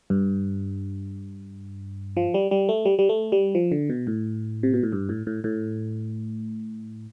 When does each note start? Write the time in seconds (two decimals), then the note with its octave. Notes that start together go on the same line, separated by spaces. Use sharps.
0.10 G2
2.17 F3
2.34 G3
2.51 G3
2.69 A3
2.85 G3
2.99 G3
3.09 A3
3.32 G3
3.55 F3
3.72 D3
3.90 B2
4.07 A2
4.63 C3
4.74 B2
4.83 A2
4.92 G2
5.09 A2
5.27 A2
5.44 A2